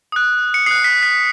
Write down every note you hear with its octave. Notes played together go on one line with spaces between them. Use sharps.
D#6 F#6
C#7
D#6 F#6 C7
B6
B6